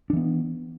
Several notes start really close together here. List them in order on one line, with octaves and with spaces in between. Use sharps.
D4 E3 B3